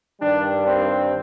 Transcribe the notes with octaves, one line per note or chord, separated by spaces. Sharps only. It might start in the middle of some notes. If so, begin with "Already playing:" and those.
G2 D#3 G3 D4
C4